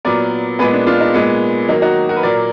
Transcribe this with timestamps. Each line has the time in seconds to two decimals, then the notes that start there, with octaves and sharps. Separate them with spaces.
0.05 A#2 F#3 B3 A#4 D5
0.59 A#2 G#3 B3 G#4 B4
0.73 D4
0.87 D4 F4
1.00 D#4
1.14 A#2 G#3 B3
1.68 D#3 F#3 A#3 D#4
1.82 D#4 F#4
2.09 F#4 A#4
2.16 B4
2.23 A#2 F#3 A#3 A#4 D5